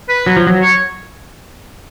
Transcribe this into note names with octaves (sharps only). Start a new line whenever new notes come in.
B4
F#3
F3
F#3
C#5